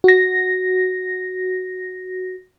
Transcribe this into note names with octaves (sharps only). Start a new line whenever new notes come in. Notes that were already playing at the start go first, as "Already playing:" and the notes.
F#4 A#6